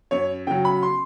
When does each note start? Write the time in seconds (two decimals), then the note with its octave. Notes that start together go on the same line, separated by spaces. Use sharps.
0.11 F#2 C#5
0.47 C#3 F#3 G5
0.65 B5
0.83 C6